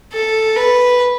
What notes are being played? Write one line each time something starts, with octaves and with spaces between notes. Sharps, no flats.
A4
B4